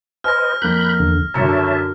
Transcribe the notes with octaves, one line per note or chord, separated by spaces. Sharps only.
B4 C5 D#5 G#5 F6 A#6
F2 A#3 B5 F#6 G6
E2 D3
F#2 D3 C#5 E5 A5 A#5 C#7